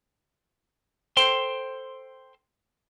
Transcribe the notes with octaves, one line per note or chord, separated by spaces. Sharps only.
A4 C5 G5 C6